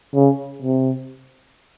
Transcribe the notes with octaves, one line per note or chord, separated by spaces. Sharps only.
C#3
C3